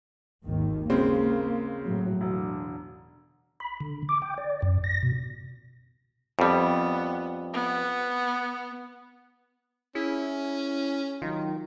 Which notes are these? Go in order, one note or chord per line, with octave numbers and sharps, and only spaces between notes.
G#1 D#2 D#3
C#3 G#3 A#3 C4
A2 F#3
E1 D3
B5
D3
D6
G5
D5
F#2
A#6
B2
F2 G3 B3
B3
C#4 E4 G#4
D#3 F#3 D#4 F4